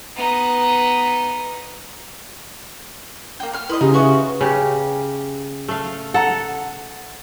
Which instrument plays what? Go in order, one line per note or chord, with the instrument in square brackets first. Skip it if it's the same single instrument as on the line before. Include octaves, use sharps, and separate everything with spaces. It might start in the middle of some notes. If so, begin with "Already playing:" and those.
[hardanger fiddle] B3 D#4
[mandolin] A#3 G5
C#6 F6
[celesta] E4 C6 D#6 [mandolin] B4 D#5
[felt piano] C#3 [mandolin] D#4 [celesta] G4
[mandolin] C#4 F#4 C#6 [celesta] B4 E5
[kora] C#3 G4
A3 F5
[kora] A4 [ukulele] F#5 A#5